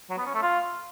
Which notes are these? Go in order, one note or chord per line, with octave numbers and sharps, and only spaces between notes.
F#3
B3
C#4
A3
F4